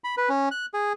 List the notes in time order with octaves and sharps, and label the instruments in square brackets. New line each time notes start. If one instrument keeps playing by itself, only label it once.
[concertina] B5
B4
C#4
F#6
G#4